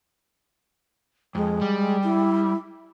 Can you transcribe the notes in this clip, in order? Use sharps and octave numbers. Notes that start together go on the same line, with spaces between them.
F2 G#3
G3
E4